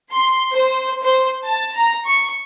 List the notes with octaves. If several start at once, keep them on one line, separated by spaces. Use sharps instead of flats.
C6
C5
C5
A5
A#5
C#6